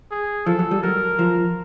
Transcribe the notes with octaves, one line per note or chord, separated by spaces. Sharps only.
G#4
F3 A4
F#3
G3
F#3 A#4
F3